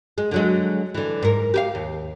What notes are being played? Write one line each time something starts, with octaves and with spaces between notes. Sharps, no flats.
G#3
D3 F#3 G#3
D3 E3
G#2 A#4
G4 A#4 F5
D#2